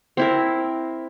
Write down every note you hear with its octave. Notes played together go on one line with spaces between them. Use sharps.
C4 E4 A#4